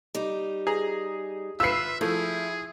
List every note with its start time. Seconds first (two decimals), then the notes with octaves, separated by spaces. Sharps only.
0.15 G3 D#4
0.67 G#4 A#5
1.60 F4 B4 E5 E6 C7
2.01 F3 A3 E4 G#4